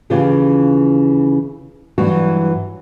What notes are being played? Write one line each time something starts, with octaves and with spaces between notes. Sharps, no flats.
D#2 C#3 E3 C#4 F4 G4
G2 E3 F#3 F#4